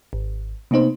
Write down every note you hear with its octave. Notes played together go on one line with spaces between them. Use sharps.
G#1
C3 A#3 B3 D#4 C5